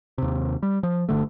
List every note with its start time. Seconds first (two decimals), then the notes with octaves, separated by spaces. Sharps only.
0.18 D#2 C3
0.63 G3
0.83 F3
1.09 G1 D3 A3